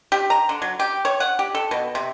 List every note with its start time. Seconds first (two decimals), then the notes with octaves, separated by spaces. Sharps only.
0.12 G4
0.30 A#5
0.49 D3
0.62 F#3
0.79 G4
1.05 C#5
1.20 F#5
1.39 G4
1.55 A4
1.71 B2
1.95 C3